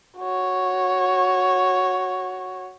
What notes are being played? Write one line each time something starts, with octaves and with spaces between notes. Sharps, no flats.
F#4 C#5